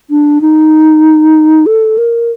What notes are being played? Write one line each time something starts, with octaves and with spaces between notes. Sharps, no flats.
D4
D#4
A4
A#4